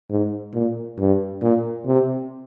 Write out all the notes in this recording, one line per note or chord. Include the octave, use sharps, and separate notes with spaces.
G#2
A#2
G2
A#2
C3